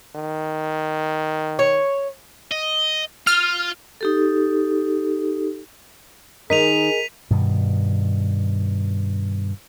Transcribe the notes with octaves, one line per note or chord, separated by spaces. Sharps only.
D#3
C#5
D#5
F4 F6
D#4 G4 A4
D#3 D#4 G#4 A#4 D#5 B6 D#7 F7
G2 B2 D#3